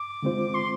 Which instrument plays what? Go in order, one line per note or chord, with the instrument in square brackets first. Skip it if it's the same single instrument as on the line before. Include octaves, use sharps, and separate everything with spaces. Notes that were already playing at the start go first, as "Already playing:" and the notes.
Already playing: [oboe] D6
[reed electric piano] D3 G#3 C4 F4 C5
[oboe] C6